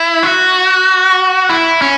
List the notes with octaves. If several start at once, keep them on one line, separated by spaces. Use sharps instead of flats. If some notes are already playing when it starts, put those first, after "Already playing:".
Already playing: E4
F#4
E4
C#4